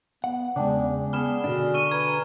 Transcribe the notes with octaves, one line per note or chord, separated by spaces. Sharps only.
B3 F#5
E2 C#3 G#3 D4 G5 G#5
B3 G#4 B4 F6 E7
B2 D3 D4
C#6 F6 D#7
B4 A#5 G#6 D#7